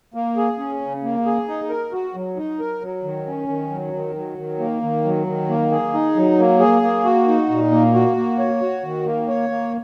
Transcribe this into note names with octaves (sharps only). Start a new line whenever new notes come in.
A#3
G#4
C#4
C#3
A#3
G#4
D#4
A#4
F#4
F#3
D#4
A#4
F#3
D#3
C#4
D#3
F#3
D#3
F#3
D#3
A#3
D#3
F#3
D#3
A#3
G#4
D#4
F#3
A#3
G#4
A#3
F#4
D#4
A#2
A#3
F#4
A#3
C#5
F#4
D#3
A#3
C#5
A#3